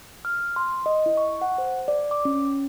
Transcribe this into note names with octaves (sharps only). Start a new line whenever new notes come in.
F6
C6
D#5
E4
C#6
F#5
C5
D5
D6
C#4